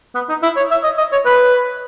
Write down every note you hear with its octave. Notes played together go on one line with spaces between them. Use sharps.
B3
D#4
E4
C#5
E5
D#5
D#5
C#5
B4